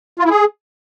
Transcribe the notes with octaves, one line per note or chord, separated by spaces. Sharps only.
F4
E4
G#4